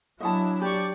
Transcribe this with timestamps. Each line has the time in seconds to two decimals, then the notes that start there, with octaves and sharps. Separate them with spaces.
0.20 F#3 D4 E4 D#5 F#5 A5
0.61 G4 D5 C#6